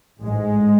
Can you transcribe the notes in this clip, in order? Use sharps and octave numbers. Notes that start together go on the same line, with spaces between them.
A1 G#2 G#3